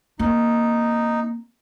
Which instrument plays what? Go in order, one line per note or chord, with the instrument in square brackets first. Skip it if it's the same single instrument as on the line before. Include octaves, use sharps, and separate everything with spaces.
[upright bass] A#3 C4 [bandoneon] D#4